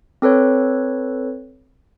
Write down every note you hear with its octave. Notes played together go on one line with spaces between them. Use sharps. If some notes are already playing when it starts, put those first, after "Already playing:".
C4 A4 B4 C#5